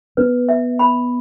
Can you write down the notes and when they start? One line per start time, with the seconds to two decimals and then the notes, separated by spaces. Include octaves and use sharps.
0.17 B3 B4
0.49 E5
0.79 B5